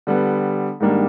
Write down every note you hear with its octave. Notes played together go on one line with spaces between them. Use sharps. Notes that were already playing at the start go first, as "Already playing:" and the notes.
D3 G3 B3
G#2 D#3 G3 A#3 D4